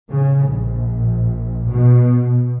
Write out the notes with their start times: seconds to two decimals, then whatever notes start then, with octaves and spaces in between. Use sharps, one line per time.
0.10 C#3
0.47 A#1
1.68 B2